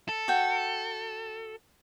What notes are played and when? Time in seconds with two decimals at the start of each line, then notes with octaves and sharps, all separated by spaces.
0.09 A4
0.28 F#4 G5